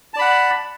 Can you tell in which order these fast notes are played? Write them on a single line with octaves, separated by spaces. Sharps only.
A5 D5 B5 F#5